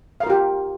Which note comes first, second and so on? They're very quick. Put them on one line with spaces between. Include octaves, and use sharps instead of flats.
F5 A#4 F4 G4